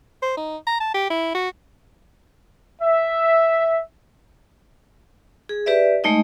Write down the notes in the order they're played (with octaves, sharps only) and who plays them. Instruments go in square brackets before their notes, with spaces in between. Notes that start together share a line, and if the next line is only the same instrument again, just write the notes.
[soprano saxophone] C5
D#4
A#5
A5
G4
E4
F#4
[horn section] E5
[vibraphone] G#4
G4 B4 D5 E5
G#3 A3 D#4 D#5